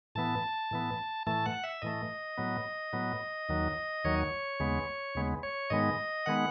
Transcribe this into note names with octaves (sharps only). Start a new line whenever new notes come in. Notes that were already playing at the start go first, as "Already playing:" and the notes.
A2 E3 B3 A5
A2 E3 B3
A2 E3 A3 A5
F#5
E5
A2 E3 A3 D#5
A2 F#3 B3
A2 F#3 B3
D#2 D#3 F#3
D#2 D#3 F#3 C#5
D#2 C#3 G#3 B3
D#2 C#3 G#3 B3
C#5
G#2 D#3 G#3 B3 D#5
D#3 G#3 B3 F#5